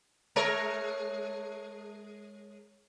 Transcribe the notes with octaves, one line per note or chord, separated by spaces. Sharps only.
G#3 A#4 C#5